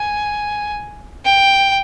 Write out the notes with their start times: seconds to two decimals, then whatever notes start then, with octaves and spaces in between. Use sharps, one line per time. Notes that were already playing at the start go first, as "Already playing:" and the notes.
Already playing: G#5
1.25 G5